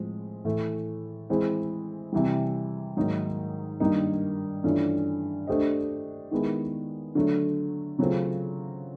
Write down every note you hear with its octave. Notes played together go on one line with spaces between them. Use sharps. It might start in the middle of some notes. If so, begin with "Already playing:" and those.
Already playing: A2 F3 G#3 C4
A2 E3 A3
E3 G#3 C4 E4
C3 E3 G3
G#2 D#3 F#3 A#3 D#4
G2 D#3 G3 A#3 D#4
G2 E3 A3 C#4 F4
A3 D4 G4 C5 D#5
D#3 G#3 B3 E4
D3 F#3 A3
C#3 F#3 A3 C4 F4